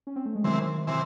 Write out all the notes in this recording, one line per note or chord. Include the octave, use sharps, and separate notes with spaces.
C#4
C4
A3
G#3
C3 D#3 E3 F#3 C4
C3 E3 C4